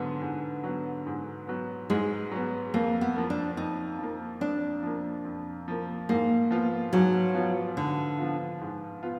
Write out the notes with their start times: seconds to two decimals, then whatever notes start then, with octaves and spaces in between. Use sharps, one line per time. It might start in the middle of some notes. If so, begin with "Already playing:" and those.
Already playing: G#2 D3 F#3 B3
0.22 G#2
0.64 F#3 B3
1.07 G#2
1.47 F#3 B3
1.90 G#2 G#3
2.32 F#3 B3
2.74 F2 A#3
3.01 B3
3.16 F3 A#3
3.30 D4
3.57 F2 D#4
3.99 F3 A#3
4.41 F2 D4
4.83 F3 A#3
5.25 F2
5.68 F3 A#3
6.09 G#2 A#3
6.51 F3 B3 F4
6.93 G#2 F#3
7.34 F3 B3 F4
7.77 G#2 D3
8.19 F3 B3 F4
8.61 G#2
9.03 B3 F4